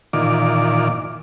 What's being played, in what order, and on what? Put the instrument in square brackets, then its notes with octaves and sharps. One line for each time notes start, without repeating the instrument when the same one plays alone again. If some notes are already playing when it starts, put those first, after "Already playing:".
[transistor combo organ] A#2 D#3 E3 F4 D5 D6